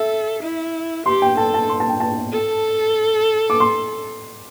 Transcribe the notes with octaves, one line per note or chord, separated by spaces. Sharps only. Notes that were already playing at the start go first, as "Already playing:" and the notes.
Already playing: A4 E5
E4
G4 C6
G5
A4 A5
A5
C6
A5
G5
A5
A4
D6
C6